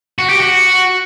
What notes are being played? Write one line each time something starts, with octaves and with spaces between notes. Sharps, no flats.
F#4
G4
F#4